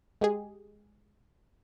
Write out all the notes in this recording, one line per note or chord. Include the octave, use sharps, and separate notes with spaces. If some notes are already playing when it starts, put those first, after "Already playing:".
G#3 G4 G#4